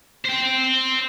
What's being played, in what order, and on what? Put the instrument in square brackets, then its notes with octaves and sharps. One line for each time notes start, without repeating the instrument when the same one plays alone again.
[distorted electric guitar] C5 G5